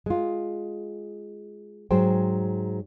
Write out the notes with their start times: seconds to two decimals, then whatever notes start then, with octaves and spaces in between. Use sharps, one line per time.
0.06 G#3 F4
1.91 G#2 F#3 G#4 C5 G5